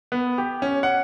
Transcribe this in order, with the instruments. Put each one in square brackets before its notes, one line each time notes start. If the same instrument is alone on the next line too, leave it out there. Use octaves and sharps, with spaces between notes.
[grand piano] B3
G4
C#4
F#5